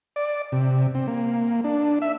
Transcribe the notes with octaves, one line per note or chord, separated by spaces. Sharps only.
D5
C3
C4
A#3
D4
E5